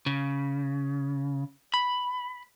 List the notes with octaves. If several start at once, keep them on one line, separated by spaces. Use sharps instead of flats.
C#3
B5